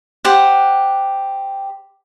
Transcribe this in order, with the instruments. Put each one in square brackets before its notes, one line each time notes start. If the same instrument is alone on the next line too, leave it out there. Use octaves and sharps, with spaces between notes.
[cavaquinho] G4 C5 F#5